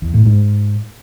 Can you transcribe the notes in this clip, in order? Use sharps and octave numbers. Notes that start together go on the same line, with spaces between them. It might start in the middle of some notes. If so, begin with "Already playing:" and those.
E2
A2
G#2